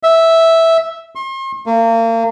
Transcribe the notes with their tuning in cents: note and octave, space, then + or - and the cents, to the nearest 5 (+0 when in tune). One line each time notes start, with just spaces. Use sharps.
E5 -5
C6 +40
A#3 -35